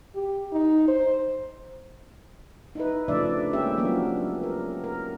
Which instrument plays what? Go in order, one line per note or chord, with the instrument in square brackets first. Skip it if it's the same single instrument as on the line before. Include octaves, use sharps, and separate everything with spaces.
[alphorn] G4
D#4
C5
[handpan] D#4 E4 B4
C#3 F3 A3 D4 D5 E5
G#3 A#3 C#4 G4 E5
F3 F#3 A#3 B3 D4
A#4
A#4